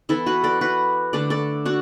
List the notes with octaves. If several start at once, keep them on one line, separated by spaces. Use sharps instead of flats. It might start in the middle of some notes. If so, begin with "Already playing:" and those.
E3 B3 E4 A4
F#4 B4
A4 D5
F#4 B4
D3 A3 A4 D5
A4 D5
D4 F#4